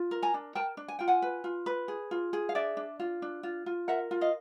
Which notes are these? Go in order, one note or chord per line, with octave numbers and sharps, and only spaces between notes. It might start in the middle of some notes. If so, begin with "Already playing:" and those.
Already playing: F4
A#4
G#5 A#5
D4
A#4 G5 A5
D4
G#5
F4 G5
F#5 G#5
B4
F4
B4
G#4
F4
G#4
F5
D4 D5 E5
D4
F4
D4
F4
F4
A#4 E5 F#5
F4
D#5 F5